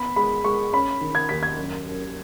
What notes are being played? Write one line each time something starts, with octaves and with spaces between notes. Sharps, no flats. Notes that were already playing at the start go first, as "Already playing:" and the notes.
Already playing: B3 B5
G#3 B5
G#3 C#6
C#4 B5
D#3
G#6
D#2 B6
G#6
F#2
F#2